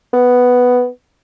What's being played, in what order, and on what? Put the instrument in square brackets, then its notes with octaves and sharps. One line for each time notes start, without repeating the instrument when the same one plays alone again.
[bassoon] B3